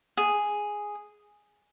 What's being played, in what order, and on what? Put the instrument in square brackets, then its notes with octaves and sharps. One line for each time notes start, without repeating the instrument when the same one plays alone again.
[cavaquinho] G#4